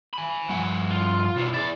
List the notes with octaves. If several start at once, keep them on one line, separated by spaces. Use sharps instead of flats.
G#5 B5
G2 F3 F#5
F4
B2 E4 C5
E4 G#4 D5